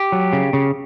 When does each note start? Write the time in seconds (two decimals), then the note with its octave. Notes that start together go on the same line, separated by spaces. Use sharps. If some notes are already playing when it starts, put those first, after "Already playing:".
Already playing: G4
0.12 F#3
0.33 C#3
0.53 C#3